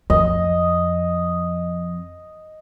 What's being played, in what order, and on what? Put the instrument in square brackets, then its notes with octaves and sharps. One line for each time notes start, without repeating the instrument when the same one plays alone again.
[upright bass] F2 [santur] D#5